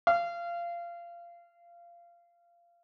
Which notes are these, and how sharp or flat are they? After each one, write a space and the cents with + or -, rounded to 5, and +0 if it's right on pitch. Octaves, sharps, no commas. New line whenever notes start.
F5 -20